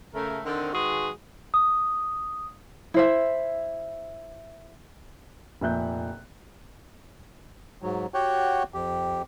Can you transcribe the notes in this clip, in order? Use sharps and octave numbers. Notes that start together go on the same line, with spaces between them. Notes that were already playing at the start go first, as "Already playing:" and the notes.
C#3 A3 A#4
D3 D#3 C4
D#3 G#3 F#4 G#4 B4 C6
D#6
E4 C5 E5
F1 A#2 E5 F#6 G6
G#2 F#3
F#4 G4 C#5 F#5 G5
F2 G4